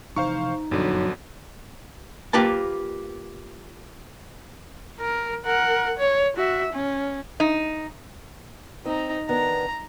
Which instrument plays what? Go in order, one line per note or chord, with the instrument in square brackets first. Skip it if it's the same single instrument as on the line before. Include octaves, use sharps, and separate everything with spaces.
[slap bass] F1 E3 [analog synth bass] D#4 [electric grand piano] C5 F5 C#6
[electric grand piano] G1 D3 [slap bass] F#2 A#2 F3 [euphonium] F#3
[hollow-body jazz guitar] A#3 F4 G4 B4 A5
[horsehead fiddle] A#4
A#4 F#5
C#5
F#4 E5
C#4
[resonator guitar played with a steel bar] D#4
[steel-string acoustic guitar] C4 [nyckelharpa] D#4 A#5
[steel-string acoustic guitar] D#3 B3 D4 [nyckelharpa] A#5